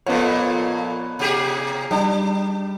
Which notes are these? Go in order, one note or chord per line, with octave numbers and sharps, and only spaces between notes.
F2 A#2 B3 F4 C#5
C3 G4 G#4
G3 D4